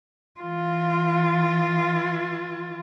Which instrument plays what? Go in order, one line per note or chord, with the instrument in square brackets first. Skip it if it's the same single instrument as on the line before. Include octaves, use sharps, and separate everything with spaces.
[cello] E3 F4